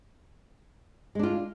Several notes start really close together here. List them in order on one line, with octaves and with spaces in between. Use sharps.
G#3 D4 F4